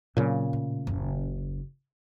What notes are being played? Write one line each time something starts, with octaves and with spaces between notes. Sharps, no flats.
A#2 C#3 F#3 C4
A2
F#1 D#2